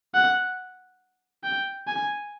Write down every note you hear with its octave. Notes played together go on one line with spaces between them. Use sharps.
F#5
G5
G#5